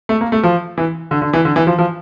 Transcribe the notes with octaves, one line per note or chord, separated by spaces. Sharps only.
A3
A#3
A3
F3
E3
D3
D3
E3
D3
E3
F3
F3